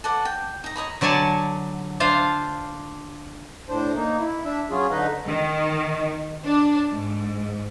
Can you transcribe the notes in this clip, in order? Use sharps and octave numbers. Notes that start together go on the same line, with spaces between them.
A4 B4 D5 F#5
G5
D#4 A#5
C#5 D#5 A#5 B5
D3 F#3 D5 G#5 A5
D4 F4 C5 F5
A2 D4 C5
A#3 D#4
E4
D4 E5
F#3 C#4 F4 G#4
D3 D#4 B4 D#5
D#3
D4
G#2